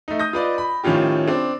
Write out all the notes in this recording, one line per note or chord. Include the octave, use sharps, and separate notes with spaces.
A3 D#4
D#6 G6 A#6
F4 B4 D5 D#5
B5
A2 D#3 F3 C#4 F4 G4
C4 D4